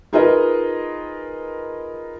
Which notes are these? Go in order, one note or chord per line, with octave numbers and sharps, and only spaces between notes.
D#4 F4 G#4 A#4 B4 D#5